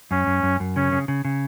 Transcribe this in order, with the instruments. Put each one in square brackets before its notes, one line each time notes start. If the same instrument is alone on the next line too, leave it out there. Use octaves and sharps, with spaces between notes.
[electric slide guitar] F#2 [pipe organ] C#4
[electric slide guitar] F#2
F#2
F#2
[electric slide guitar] C#3 [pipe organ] C#4
[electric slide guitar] C#3
C#3
C#3